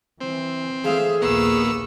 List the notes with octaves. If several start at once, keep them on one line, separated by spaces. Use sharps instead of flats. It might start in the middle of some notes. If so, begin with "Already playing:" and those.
E3 C4
E3 A3 G#4 E5 F5
A#1 D#2 A#3 B3 C#6 E6